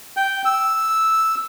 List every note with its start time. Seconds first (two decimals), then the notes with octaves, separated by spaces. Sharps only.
0.17 G5
0.45 E6